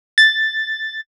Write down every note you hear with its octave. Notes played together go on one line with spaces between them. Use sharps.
A6